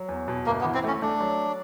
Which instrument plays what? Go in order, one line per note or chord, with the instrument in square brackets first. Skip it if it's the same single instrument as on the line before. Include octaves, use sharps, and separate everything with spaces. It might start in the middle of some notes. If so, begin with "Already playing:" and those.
Already playing: [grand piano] F#3
E2
B2
[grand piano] G1 [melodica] A#3
[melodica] B3
[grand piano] E3
[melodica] C4
[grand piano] A3 [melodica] C#4
[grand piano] A3 [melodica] D4
[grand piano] F#3